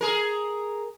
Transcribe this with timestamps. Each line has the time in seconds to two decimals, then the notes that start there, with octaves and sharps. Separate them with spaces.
0.01 G#4 A#4